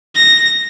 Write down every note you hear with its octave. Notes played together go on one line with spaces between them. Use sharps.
A#6